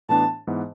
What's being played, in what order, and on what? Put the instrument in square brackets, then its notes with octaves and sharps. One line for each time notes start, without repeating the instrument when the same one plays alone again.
[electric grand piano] A2 E3 B3 D4 [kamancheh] A5
[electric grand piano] G#2 E3 B3